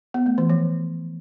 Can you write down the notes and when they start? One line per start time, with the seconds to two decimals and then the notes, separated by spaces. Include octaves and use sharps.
0.14 B3
0.26 A3
0.38 E3
0.50 F3